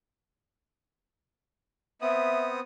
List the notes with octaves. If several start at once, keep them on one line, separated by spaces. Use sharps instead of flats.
B3 C4 E5 D#6